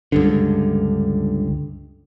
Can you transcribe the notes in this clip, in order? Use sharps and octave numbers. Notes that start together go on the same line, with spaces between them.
C#2 G2 D3